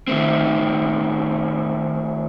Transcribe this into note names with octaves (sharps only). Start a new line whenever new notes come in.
D#3 A3 C4